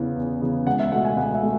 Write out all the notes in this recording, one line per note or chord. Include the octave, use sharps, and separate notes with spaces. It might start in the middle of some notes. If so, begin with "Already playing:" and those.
Already playing: E2 C#3 E3 B3
E2
C#3 E3 B3
C#2 F#5
E5
B2 A3 F#5
G#5
C#2 F#5
E5
A3